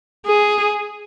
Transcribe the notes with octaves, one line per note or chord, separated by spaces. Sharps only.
G#4